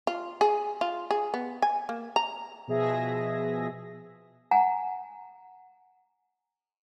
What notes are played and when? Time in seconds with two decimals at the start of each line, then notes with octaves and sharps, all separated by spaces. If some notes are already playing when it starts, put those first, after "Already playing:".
0.07 F4
0.41 G#4
0.81 F4
1.11 G#4
1.34 B3
1.62 G#5
1.89 A#3
2.16 A#5
2.68 B2 F3 G#4 E5 A#6
4.51 F#5 G#5 A#5